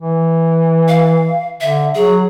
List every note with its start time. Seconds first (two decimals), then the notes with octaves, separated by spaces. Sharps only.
0.01 E3
0.88 F5
1.61 D3 E5
1.95 F#3 G#4